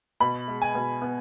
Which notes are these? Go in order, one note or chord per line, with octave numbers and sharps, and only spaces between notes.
B2 B5
G#3
G#5
B2
B3